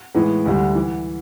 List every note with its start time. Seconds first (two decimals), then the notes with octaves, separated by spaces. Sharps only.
0.15 A2 E3 G#3 B3
0.46 D2 D3 G3
0.75 E3